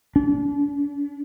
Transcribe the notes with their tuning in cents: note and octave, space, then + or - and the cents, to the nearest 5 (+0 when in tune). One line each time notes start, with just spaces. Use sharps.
D4 -40